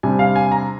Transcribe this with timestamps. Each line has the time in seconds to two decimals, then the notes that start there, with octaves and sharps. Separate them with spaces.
0.03 C3 G3 D4 G#5
0.19 F5
0.36 G#5
0.52 A#5